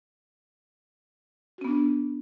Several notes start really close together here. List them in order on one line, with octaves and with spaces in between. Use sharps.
F#4 C#4 B3 D4